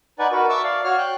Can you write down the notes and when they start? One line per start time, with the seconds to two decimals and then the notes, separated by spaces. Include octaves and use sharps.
0.19 D#4 B4 D5 F#5 G#5
0.32 F#4 A#4 B4
0.49 E5 A5 C#6 D6 E6
0.64 D5 F5
0.84 F#4 C#5 F6
0.98 G5 F#6